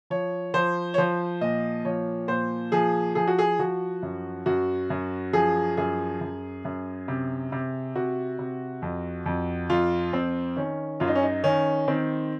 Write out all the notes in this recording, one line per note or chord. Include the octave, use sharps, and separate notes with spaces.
F3 C#5
F3 C5
C#5
F3 C5
A#2 D#5
F3 C#5
A#2 C5
F3 G#4
F3 G#4
F#4
G#4
F3 F#4
F#2
F#2 F#4
F#2
F3 G#4
F#2 G#4
F#2
F#2
C3
C3
C3 F#4
C3
F2
F2
F2 F4
F2 C4
D#3 C#4
F#2 F4
D#4
C#4
D#4
D#3 C#4
D#3 C4